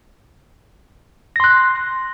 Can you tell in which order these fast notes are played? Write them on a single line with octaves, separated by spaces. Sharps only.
A#6 C6 F#6